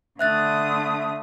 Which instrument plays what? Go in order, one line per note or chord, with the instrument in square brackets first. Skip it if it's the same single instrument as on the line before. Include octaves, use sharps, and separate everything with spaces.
[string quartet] D3 A3 D#6 [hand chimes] E5 F#6 A6